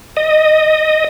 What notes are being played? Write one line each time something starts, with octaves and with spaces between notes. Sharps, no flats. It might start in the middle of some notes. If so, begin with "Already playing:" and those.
D#5